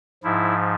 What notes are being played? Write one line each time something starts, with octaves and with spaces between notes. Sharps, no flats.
G#2 F3 E4